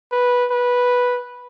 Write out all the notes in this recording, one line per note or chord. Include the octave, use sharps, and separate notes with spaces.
B4
B4